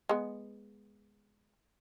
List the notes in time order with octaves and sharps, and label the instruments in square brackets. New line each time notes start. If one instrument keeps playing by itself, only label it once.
[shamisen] G#3 B3